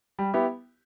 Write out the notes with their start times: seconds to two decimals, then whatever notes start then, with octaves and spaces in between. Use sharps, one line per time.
0.19 G3
0.34 B3 E4 G4